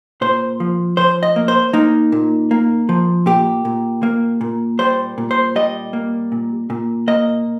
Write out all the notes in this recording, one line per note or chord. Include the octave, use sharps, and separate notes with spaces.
A#2 C5
F3
F3 C5
D#5
A#3
C5
A#3 D#4
A#2
A#3
F3
A#2 G4
A#2
A#3
A#2
G3 C5
A#2
C5
G3 D#5
A#3
A#2
A#2
A#3 D#5